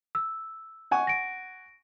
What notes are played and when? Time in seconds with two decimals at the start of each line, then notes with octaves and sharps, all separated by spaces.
0.15 E6
0.91 F#5 G#5 C#6
1.07 A#6 D7